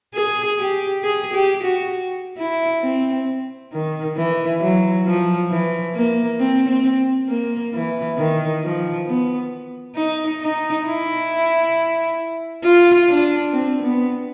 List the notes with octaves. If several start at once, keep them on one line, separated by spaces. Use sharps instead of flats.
G#4
G4
G#4
G4
F#4
E4
C4
D#3
E3
F#3
F3
E3
A#3
C4
C4
A#3
E3
D#3
F3
B3
D#4
D#4
E4
F4
D4
C4
B3